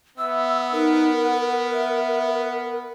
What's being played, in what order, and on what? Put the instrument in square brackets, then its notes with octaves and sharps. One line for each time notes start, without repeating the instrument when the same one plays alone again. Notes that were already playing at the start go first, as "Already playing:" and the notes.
[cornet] B3 [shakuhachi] E5 [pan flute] E6
[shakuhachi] D#4 [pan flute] A#4
[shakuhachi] F#5
E5